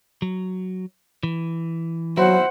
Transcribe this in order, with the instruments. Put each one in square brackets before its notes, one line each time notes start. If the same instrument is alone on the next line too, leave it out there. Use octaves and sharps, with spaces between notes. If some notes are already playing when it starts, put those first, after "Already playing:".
[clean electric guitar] F#3
E3
[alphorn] F#3 [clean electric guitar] E4 F#4 [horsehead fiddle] C5 F#5